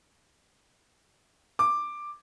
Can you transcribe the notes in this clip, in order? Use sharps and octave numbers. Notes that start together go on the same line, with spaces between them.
D6